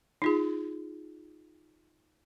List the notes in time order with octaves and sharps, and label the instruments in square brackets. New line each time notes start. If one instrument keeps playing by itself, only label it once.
[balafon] D#4 F4 G#4